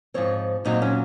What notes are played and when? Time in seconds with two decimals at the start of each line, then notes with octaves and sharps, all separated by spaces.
0.14 G#2 F3 C4 C#5
0.65 A#2 F#3 C4 D#4
0.82 C#4